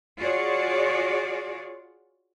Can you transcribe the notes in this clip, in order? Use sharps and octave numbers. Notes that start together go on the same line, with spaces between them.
F4 F#4 G#4 C#5 D5